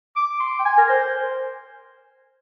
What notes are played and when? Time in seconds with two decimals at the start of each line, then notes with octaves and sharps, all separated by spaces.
0.16 D6
0.40 C6
0.59 G5
0.65 G#5
0.78 A#4
0.89 C5